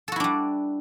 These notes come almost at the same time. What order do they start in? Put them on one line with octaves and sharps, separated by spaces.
A4 F#4 E4 D4 G3